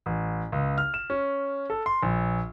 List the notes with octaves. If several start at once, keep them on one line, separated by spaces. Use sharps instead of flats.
A1
C#2
F6
E7
C#4
A4
C6
A#1